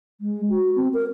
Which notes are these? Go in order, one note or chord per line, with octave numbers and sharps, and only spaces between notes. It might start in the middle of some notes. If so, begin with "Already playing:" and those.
G#3
F#4
C4
A#4